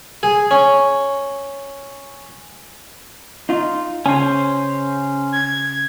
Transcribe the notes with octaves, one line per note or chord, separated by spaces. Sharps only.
G#4
C#4
D#4 F4
C#3 C#4 C5 G#5
G#6